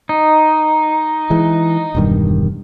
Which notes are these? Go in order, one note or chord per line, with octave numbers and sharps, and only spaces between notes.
D#4
E3 G#3
E1 G2 D#3